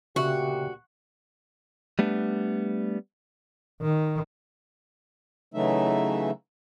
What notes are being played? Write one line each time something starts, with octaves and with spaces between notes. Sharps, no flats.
D2 A#2 C#3 F#4 G4 E5 F#6
G3 A3 B3 D4
D#3
C#3 E3 F#3 A3 D#4 E5